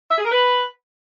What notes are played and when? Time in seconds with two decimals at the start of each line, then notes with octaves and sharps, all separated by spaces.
0.11 E5
0.18 G#4
0.25 A#4
0.32 B4